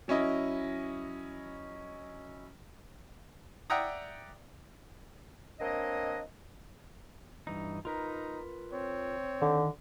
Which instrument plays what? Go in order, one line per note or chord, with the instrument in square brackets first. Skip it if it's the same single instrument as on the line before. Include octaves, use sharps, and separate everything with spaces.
[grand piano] F#3 C#4 E4 D#5
[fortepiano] D5 E5 F#5 G5 A#5 D#6
[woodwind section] A#3 C4 D4 C#5 D#5
[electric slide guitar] G2 E3 D#4
[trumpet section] D#4 A#5 [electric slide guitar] F4 A#4 B4
[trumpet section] C4 C#5
[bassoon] D3 [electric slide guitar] D#3